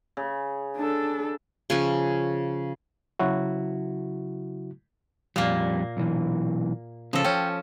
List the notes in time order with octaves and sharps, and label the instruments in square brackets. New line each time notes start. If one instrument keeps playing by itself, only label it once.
[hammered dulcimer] C#3
[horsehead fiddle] D4 A4
[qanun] C#3 F3 C#4
[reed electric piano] C#3 F#3 E4 F#4
[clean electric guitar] F2 G3 [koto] A#2 A#3
[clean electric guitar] B1 E3
[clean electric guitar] C#3 B3 C#4 [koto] F3 A4
[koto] C#4 [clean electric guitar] G5